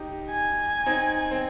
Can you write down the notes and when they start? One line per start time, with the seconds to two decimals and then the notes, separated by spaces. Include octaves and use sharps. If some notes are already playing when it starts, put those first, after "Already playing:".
Already playing: D#4 G4
0.30 G#5
0.86 C4 D#4
1.31 C4